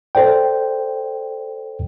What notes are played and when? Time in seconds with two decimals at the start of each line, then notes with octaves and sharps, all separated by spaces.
0.15 A4 C5 D5 G5